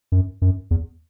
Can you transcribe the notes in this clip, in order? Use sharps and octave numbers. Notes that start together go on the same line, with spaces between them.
F#2
F#2
E2